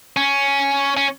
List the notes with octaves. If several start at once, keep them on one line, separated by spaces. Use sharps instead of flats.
C#4
C#4